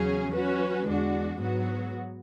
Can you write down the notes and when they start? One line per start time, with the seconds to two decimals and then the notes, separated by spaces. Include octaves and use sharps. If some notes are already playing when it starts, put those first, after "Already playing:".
Already playing: E2 C#3 F#3 C#4 G#4
0.32 F#3 C#4 F#4 B4
0.86 E2 D3 G#3 D4 F#4
1.40 G#2 F#3 B3 F#4